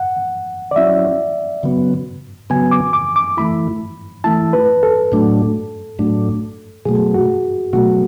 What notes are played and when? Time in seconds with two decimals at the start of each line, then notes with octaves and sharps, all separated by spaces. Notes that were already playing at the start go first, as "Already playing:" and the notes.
Already playing: F#5
0.71 D5
0.76 F#3 C#4 E4 E5
1.63 C#3 F#3 B3
2.50 C#3 F#3 B3 G#5
2.71 D6
2.93 D6
3.16 D6
3.37 E3 A3 E4 B5
4.24 E3 A3 E4 A5
4.53 B4
4.83 A4
5.12 A2 F#3 A3 D4
5.99 A2 F#3 A3 D4
6.85 B2 F#3 A3 G#4
7.14 F#4
7.73 B2 F#3 A3 F#4